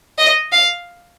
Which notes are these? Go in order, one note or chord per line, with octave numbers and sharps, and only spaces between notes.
D#5
F5